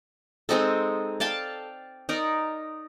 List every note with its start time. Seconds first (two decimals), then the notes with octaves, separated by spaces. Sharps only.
0.49 G#3 C4 D#4 A4
1.20 D5 F5 G5 A5
2.09 D#4 A#4 D5